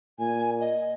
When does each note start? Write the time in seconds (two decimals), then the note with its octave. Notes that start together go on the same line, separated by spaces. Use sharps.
0.19 A#2 G#5
0.60 D#5